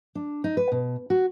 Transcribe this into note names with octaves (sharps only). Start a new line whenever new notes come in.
D4
D#4
B4
B2
F#4